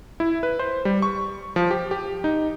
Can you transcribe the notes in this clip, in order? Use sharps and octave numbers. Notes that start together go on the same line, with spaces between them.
E4
B4
C5
G3
C#6
F3
G4
G4
D#4